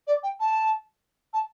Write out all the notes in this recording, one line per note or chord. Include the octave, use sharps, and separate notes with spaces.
D5
G5
A5
A5